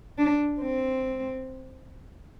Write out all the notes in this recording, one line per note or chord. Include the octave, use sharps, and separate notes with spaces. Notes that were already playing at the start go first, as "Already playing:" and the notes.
D4
C4